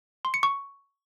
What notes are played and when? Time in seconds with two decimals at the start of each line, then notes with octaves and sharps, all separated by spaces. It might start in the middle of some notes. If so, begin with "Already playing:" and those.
0.25 C6
0.34 C#7
0.43 C#6